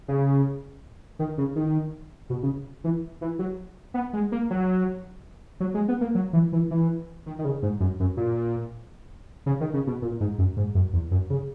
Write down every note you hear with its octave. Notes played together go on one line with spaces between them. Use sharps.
C#3
D#3
C#3
D#3
B2
C#3
E3
E3
F#3
B3
G#3
A#3
F#3
F#3
G#3
B3
A#3
F#3
E3
E3
E3
D#3
D#3
C#3
G#2
F#2
F#2
A#2
C#3
D#3
C#3
B2
A#2
G#2
F#2
G#2
F#2
E2
F#2
C#3